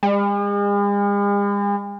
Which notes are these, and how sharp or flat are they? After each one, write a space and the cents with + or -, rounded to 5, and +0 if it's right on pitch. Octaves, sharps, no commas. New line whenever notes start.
G#3 -45